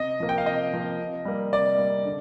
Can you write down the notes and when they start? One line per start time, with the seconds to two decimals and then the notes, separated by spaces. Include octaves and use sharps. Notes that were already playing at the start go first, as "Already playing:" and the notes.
Already playing: C3 D#5
0.20 F3 A#3
0.29 G5
0.38 F5
0.46 C3 D#5
0.73 F3 A#3
0.99 C3
1.25 G3 A#3
1.52 C3 D5
1.78 G3 A#3
2.05 D3